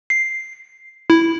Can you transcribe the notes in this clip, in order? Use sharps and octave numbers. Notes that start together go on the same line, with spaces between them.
C7
E4